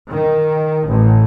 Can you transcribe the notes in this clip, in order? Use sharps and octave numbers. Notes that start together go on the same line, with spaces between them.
D#3
A1